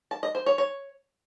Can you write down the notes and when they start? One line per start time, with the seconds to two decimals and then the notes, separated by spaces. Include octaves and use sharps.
0.11 A5
0.23 D#5
0.35 C5
0.46 C#5
0.58 C#5